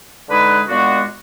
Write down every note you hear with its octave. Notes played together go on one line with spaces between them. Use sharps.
D3 G#3 D#4 G#4 B4
A#2 G#3 B3 D4 F#4